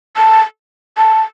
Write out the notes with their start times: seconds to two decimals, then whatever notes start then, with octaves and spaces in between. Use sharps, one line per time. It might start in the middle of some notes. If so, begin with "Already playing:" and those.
0.17 A5
0.97 A5